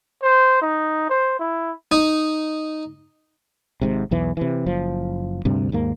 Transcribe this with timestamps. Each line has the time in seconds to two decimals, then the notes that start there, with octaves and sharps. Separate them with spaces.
0.23 C5
0.62 D#4
1.09 C5
1.39 E4
1.92 D#4
3.81 G#1 G#2 C3
4.11 B1 E2 E3
4.37 C3 E3
4.66 F#1 F3
5.45 D2 G2 C3
5.72 D#2 G#2 A#3